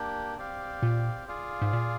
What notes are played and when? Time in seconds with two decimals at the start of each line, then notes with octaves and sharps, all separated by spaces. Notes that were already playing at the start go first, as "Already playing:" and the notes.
Already playing: A#3 D4 G4
0.37 C4 G4 D5 F5
0.82 A#2
1.28 F4 G#4 D5 F5
1.62 G#2
1.73 A#2